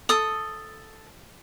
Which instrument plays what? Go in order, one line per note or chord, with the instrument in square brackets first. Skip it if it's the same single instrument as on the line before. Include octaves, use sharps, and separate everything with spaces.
[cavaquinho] A4 D#6